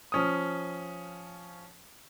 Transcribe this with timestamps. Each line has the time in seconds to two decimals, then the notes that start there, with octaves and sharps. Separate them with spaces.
0.12 F3 C#4 D#6